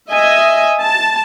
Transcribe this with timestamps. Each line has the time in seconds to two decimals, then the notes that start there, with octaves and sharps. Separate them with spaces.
0.11 D#5 E5 G#5
0.82 A5